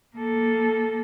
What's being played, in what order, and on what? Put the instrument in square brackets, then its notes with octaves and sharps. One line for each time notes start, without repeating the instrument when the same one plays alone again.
[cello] A#3 A4